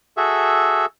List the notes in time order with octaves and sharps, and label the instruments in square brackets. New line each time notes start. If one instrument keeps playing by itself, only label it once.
[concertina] F#4 G#4 A4 E5